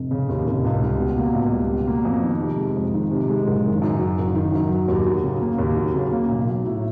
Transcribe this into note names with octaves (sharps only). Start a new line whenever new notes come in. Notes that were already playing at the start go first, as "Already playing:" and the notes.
Already playing: F1
C#3
D#2
F1
C#2
G3
B2
A#3
C#2
G3
B2
A#3
F2
D#3
C3
G#3
F2
D#3
C3
G#3
F#1
D#3
F#2
F#3
F#1
D#3
F#2
F#3
D#2
F#3
C#3
A#3
D#2
F#3
C#3
A#3
B1
F#3
A2